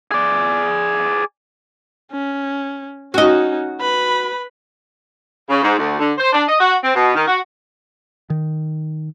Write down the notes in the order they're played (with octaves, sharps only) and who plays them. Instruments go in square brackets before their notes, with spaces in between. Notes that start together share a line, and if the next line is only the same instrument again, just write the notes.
[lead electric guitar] G#4 D5
[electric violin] C#4
[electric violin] C#4 D#4 [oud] F#4 D#5
[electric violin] B4 B5
[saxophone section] C#3
G#2
D2
D3
C5
D4
D#5
F#4
C4
B2
D#3
F#4
[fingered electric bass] D#3